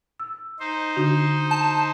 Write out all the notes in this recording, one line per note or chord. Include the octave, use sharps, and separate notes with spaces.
E6
D#4 C5
D3 D4 F#4
A5